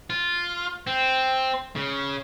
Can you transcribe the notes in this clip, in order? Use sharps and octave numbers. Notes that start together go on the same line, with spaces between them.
F4
C4
C#3